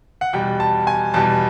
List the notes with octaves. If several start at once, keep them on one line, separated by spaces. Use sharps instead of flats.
F#5
E2 B2 G3 G5
A5
G#5
E2 B2 G3 A5